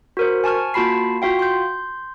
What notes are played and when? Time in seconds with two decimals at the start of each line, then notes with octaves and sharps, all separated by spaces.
0.17 F#4 A#4 C5
0.44 G#5 A5 C#6 F6
0.74 A#3 F4 F#4 A5 B5 C7
1.22 F4 F#4 F5 G5
1.39 C6 G6